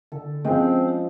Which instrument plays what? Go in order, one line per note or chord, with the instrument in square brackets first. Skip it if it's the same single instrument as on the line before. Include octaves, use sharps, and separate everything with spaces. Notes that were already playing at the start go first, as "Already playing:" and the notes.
[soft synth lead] D3 [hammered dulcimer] A4
[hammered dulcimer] F3 D#5 [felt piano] G#3 G5 [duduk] C4 [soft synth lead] C#4